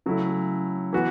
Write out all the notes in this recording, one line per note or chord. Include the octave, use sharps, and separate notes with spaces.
C#3 F#3 A3 C#4 E4
E3 B3 F#4